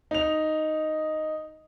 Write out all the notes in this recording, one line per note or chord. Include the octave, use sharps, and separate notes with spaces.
D#4 F7